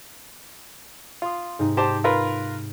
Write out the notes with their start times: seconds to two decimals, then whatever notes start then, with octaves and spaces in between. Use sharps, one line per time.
1.22 F4 C6 D#6
1.59 G#2 C3 D#4
1.77 G4 C5 D#5 A5
2.04 F4 A#4 B4